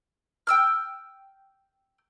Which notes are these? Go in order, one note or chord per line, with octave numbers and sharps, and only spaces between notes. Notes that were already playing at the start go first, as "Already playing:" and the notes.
G5 E6 F6